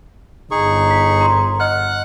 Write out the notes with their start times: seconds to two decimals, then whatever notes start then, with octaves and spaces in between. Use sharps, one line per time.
0.51 G1 D#4 G#4 C#6
0.90 B6
1.21 A#5 C6
1.60 D#5 F#5 F6 F#6